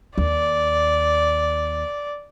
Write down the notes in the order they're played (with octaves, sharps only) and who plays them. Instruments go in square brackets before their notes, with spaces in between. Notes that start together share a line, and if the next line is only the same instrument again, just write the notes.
[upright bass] D#2 [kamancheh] D5